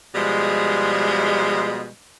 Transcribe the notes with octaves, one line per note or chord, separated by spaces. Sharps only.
B2 F3 G3 G#3